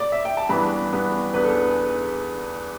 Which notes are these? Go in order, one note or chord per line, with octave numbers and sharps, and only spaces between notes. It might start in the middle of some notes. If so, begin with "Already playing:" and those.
D5
E5
G5
A5
G2 E3 B3 D4 B5
G2 E3 B3 D4
E2 E3 B3 D4 B4
A4
B4